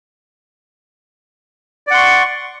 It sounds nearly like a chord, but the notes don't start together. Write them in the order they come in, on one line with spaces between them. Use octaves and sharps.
D5 F#5 C6 C#6